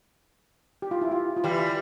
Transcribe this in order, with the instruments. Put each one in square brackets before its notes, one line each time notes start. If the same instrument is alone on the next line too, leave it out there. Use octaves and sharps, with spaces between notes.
[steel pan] G4
F4
E4
F4
F4
[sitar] E3 G3 [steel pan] G4